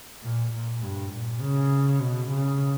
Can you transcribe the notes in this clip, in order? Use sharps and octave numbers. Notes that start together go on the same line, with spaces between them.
A#2
A#2
G2
A#2
C#3
B2
C#3